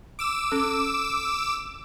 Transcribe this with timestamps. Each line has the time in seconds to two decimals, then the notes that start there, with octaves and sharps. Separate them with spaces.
0.19 D6 E6 E7
0.52 C#4 A4